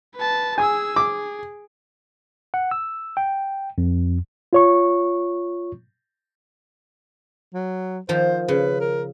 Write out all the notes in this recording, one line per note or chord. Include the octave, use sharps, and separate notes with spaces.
B4 A5
G#4 G#5 E6
G#4 D6
F#5
E6
G5
F2
F4 C#5 C#6
F#3
D#3 F3 C5
C#3 B4
A#4